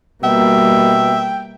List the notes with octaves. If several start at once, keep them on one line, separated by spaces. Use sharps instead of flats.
B2 G3 A#3 E5 G5